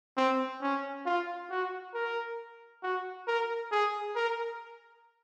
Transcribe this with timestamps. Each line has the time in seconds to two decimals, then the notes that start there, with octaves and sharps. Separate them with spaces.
0.17 C4
0.62 C#4
1.06 F4
1.50 F#4
1.94 A#4
2.83 F#4
3.28 A#4
3.72 G#4
4.15 A#4